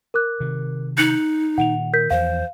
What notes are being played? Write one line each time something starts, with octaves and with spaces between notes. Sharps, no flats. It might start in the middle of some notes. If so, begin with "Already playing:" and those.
A#4 D6 F#6
C3 D#3
D#4 F#6 C#7 F#7
A#2 D#3 F#5 F7
A#4 G6 B6
E2 E3 F3 C5 F5